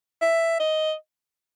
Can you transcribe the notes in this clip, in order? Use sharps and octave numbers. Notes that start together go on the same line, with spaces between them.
E5
D#5